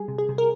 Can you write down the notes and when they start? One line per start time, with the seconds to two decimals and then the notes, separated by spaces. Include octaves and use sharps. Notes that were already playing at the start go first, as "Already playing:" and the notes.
Already playing: G3 G#4
0.08 C3
0.18 G#4
0.29 C3
0.38 A#4